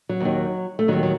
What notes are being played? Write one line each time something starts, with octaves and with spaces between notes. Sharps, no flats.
F#3
D#2 D#3
A3
D#2 D#3 F#3
F#3